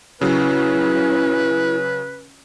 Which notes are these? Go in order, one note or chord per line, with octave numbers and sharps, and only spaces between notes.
C#3 F#3 C#4 E4 B4